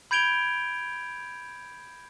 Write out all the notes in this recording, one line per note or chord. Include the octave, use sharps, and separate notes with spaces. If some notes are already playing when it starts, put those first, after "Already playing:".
B5 G6 G#6 D7 F7 G7